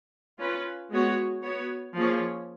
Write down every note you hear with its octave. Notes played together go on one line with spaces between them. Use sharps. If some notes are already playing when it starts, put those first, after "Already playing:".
C#4 F4 B4
G#3 B3 F#4 C#5
B3 F#4 C#5
F3 A#3 C#4 G#4 C#5